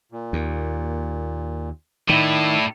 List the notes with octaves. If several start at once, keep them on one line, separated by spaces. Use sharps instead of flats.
A#2
D#2
A2 D#3 E4 D5